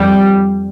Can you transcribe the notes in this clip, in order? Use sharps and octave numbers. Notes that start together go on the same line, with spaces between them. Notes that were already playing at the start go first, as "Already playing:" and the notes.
Already playing: F2 G3